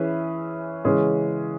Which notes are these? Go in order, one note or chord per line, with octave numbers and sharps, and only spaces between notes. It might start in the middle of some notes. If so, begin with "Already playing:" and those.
Already playing: E3 C#4 G#4 B4 E5
C#3 E3 G#3 C#4 G#4